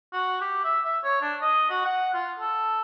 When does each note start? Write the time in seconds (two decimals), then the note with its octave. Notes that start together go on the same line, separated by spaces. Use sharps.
0.13 F#4
0.41 G4
0.64 E5
0.85 E5
1.04 C#5
1.22 D4
1.42 D#5
1.70 F#4
1.85 F#5
2.14 F4
2.40 A4